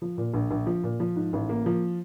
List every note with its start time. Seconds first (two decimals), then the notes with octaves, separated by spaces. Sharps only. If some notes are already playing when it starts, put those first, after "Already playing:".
0.02 F3
0.18 A#2
0.34 A#1
0.51 A#1
0.67 F3
0.84 A#2
1.00 F3
1.16 G#2
1.33 A1
1.49 A#3
1.66 F3